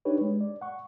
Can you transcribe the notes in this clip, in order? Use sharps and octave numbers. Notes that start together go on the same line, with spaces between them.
D4 D#4 G4 B4 C#5
G#3
D5
F#5 C#6